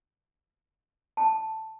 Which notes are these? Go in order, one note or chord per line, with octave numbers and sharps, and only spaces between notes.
A5